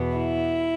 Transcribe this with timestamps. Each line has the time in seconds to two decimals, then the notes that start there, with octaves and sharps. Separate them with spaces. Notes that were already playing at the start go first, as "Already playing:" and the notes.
Already playing: E2 B2 B3
0.16 E4